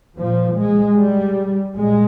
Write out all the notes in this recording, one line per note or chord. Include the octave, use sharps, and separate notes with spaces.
A#2 F3
G#3
G3
A#2 G#3